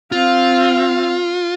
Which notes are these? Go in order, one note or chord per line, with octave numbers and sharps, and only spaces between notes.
C4 F4 F5